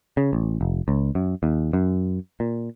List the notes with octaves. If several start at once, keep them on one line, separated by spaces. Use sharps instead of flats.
C#3
A1
F1
C#2
F#2
D#2
F#2
A#2